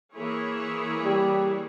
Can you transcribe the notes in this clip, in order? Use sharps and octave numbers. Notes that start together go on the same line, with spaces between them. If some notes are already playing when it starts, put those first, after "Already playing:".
E3 A#3 E4 G#4 C#5
G3